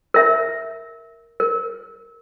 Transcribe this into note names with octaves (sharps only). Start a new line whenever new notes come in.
A#4 E5
A#4